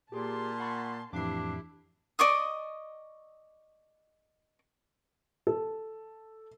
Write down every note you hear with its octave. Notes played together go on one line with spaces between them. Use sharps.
A#2 G4 G#4 A5 C6 D6
F#5 B5 C#6
F2 A2 E3 D4 E4 G4 D6 C7
D5 D#5 C#6 D#6
A4